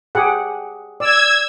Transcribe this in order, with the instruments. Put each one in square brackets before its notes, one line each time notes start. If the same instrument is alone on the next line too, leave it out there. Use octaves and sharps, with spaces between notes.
[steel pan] G4 G#4 F#5
[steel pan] D5 [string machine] E6 G#6